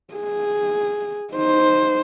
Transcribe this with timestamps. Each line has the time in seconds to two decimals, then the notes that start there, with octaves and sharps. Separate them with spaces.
0.14 G#4
1.33 D#4 C5